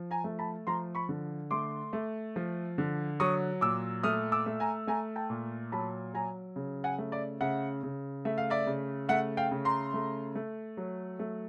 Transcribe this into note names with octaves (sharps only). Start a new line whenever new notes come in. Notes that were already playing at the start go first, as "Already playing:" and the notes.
Already playing: F3
G#5 A#5
A3
A5 B5
F3 A#5 C6
B5 C#6
D3
A3 C6 D6
A3
F3
D3
F#3 C#6 D#6
A#2 D6 E6
A3 D#6 F6
D6 E6
A3
G#5 A#5
A3 G#5 A#5
G5 A5
A#2
F#3 A5 B5
F#3 G#5 A#5
C#3
F#5 G#5
A3
D5 E5
C#3 E5 F#5
C#3
A3 E5
F5
D5 E5
C#3
A3 E5 F#5
F5 G5
C#3
A#5 C6
A3
A3
F#3
A3